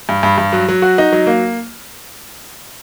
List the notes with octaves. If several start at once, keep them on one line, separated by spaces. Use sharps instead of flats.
G2
G2
G2
F#3
F#3
F#4
D#4
F#3
A#3